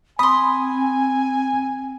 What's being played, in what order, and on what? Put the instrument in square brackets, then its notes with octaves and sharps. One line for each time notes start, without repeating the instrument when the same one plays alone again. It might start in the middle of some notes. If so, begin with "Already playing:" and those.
[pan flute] C4 [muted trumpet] G#5 [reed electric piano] B5 [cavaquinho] C6 D#6